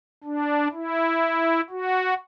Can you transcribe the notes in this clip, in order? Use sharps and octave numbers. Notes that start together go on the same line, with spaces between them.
D4
E4
F#4